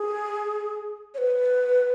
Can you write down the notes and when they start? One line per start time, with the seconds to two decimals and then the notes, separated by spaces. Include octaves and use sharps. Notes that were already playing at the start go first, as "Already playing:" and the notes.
Already playing: G#4
1.14 C#5
1.18 B4